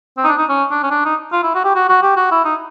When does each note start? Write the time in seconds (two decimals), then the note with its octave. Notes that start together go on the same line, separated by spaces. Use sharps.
0.17 C4
0.24 D#4
0.27 D4
0.38 D#4
0.49 C#4
0.71 D4
0.83 C#4
0.91 D4
1.05 D#4
1.32 F4
1.43 E4
1.55 F#4
1.64 G4
1.75 F#4
1.89 F#4
2.02 G4
2.17 F#4
2.31 E4
2.45 D#4